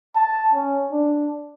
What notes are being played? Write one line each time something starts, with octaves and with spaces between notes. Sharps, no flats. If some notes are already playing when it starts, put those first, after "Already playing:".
A5
C#4
D4